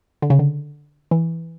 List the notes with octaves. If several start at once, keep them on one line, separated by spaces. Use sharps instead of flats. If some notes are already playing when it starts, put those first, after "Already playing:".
D3
C#3
D3
E3